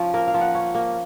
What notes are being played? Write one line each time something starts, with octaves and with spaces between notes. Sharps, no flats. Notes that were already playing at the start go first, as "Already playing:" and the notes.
Already playing: F3 C#4
A#3 A#4
F5
F3
F#5
C#4
A#3